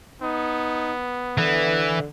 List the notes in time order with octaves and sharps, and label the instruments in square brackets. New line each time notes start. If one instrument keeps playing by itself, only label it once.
[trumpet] B3 [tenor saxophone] D#4
[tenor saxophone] D3 [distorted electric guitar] E3